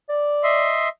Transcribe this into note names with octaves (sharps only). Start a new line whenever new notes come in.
D5
D#5 E5 C6